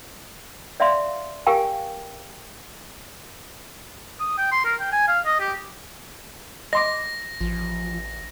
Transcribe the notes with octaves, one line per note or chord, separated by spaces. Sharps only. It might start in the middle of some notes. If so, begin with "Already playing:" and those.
D5 E5 F5 C6
G4 A#4 F5 G5 G#5
D#6
G5
C6
A#4
G5
G#5
F5
D#5
G4
D#5 C6 D6 A#6
A1 F3